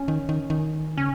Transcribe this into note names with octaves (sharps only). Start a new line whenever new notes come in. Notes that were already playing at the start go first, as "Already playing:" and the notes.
Already playing: C#4
D#3
D#3
D#3
C#3 C#4